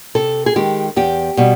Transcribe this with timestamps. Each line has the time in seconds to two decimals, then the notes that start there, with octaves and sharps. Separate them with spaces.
0.15 C3 A4
0.46 G#4
0.56 D#3 G#3 G4
0.96 E2 G4
1.37 B2 G3